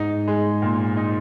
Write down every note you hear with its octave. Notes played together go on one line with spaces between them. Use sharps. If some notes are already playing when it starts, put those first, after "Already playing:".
Already playing: G#2 D#4
G#3
A#2
D#4